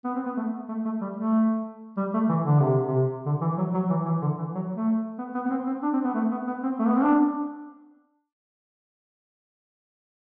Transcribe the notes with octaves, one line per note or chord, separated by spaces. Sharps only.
B3
C4
B3
A3
A3
A3
G3
A3
G3
A3
E3
D3
C3
C3
D3
E3
F#3
F#3
E3
E3
D3
E3
F#3
A3
B3
B3
B3
C4
C4
D4
C4
B3
A3
B3
B3
C4
A3
B3
C4
D4